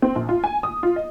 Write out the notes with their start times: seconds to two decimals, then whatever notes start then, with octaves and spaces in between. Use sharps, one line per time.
0.02 C4
0.15 A#1
0.29 F4
0.44 G#5
0.63 D#6
0.83 F4
0.96 D#5